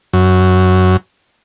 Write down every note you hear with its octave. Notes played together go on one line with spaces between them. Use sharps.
F#2